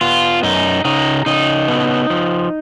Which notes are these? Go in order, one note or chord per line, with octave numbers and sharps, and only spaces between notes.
B3 F4
F#2 D#4
C#3 D#4
C#3 D#4
B3
F3